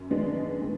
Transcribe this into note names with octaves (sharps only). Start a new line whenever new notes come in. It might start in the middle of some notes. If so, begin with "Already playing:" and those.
Already playing: F#2
D#3 G#3 B3 D4
F#2
D#3 G#3 B3